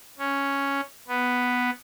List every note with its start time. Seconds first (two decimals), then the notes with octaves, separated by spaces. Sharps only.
0.19 C#4
1.08 B3